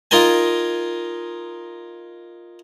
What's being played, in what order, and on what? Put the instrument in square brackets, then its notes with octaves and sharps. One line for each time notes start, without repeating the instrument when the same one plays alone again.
[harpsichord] D#4 F4 A#4 G5 G#5